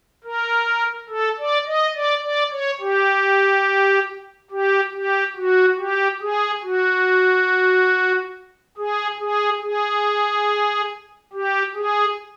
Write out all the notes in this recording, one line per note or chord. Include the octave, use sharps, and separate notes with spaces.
A#4
A4
D5
D#5
D5
D5
C#5
G4
G4
G4
F#4
G4
G#4
F#4
G#4
G#4
G#4
G4
G#4